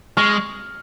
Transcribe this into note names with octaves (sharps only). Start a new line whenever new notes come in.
G#3 C#6 F6